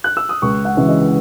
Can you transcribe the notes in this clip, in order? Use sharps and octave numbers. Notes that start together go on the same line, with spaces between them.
F#6
E6
D#6
C#2 C#6
F#5
C#3 E3 G#3
D#5